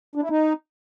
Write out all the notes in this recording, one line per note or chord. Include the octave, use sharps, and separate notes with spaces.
D4
E4
D#4